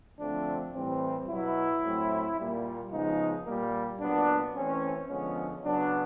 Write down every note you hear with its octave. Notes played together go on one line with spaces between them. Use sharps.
D3 F3 A3 C4 D4
A2 E3 G3 C4
B2 F#3 B3 E4
A2 F#3 A3 C4
A#2 G3 A#3
C#3 F3 G#3 B3 D#4
A#2 G3 A#3
A#2 F#3 B3 D4
E3 A3 C4 C#4
D3 F3 G#3 B3 C#4
C#3 F#3 B3 D4